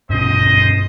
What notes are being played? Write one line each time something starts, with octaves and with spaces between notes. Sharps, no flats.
G2 B2 C#4 C5 D#5